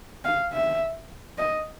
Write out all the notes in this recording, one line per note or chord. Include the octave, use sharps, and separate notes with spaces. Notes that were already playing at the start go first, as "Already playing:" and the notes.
F5
E5
D#5